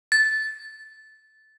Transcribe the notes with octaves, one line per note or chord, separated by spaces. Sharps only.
A6